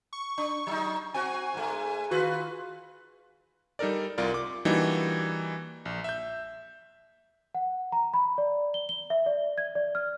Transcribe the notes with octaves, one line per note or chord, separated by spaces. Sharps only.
C#6
D4 C#6
F#3 D#4
C4 F#4 G#5
G#2 A3
D#3 F4 F#4 B4
G3 D#4 A4 A#4 D5
C2 F4 A#4 D5
D6
E3 G3 A#3 D4 D#4 F#4
A#1
E5 G6
F#5
A#5
B5
D5
G7
G7
E5
D5
G#6
D5
F6